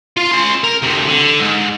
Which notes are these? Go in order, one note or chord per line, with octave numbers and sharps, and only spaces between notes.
F4 F5
C#4 C6
A#4
D2 C3
D3
G#2